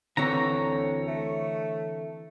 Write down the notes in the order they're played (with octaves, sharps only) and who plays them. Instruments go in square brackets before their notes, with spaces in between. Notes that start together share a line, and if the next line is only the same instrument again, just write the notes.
[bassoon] D2 [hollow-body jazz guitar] D3 E3 C4 [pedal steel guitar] C#5 A#5
[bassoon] A3